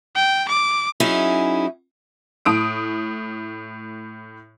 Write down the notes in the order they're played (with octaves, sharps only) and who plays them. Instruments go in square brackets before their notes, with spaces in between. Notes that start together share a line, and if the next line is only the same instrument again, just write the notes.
[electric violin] G5
D6
[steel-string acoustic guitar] F#3 C#4 D#4 E4 G#4
[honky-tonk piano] A2 D#6 D7